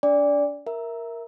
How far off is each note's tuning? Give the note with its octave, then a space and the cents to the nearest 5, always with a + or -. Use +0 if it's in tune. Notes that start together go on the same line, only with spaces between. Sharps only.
D4 -35 D5 -15 G#5 -45
A#4 +0 E5 +0